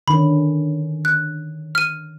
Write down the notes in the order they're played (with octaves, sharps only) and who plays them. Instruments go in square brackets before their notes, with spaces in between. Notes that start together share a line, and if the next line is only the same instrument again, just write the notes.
[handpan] D3 D#3 C#4 [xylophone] B5
[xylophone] F#6
F6 D#7